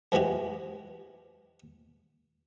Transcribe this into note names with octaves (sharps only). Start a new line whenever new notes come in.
F2 E3 G#3 F#4 G4